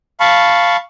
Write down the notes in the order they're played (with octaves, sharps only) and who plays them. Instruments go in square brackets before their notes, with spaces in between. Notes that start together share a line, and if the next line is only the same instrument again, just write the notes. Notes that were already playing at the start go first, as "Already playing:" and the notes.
[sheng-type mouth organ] F5 A5 B5 C#6